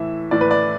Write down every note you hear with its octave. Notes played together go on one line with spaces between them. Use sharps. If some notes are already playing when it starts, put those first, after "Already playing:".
Already playing: A2 E3 E5
A2 E3 D5
B4
D5